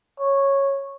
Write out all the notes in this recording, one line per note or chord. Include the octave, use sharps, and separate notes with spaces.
C#5